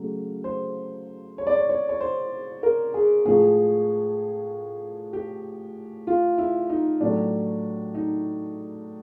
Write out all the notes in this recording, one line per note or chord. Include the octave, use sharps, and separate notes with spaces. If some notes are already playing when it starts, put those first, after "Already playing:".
Already playing: C#3 F#3 A3
C5
C#5
D5
C#5
C#5
C#5
C5
A#4
G#4
A2 F3 G#3 G#4
G4
F4
E4
D#4
A2 F#3 A3 D4
D#4